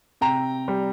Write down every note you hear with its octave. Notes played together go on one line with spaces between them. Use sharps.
C3 G5 A#5
G3